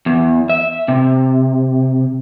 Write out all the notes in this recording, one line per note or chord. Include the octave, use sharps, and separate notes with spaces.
E2
E5
C3